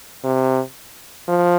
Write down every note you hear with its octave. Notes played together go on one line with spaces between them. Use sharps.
C3
F3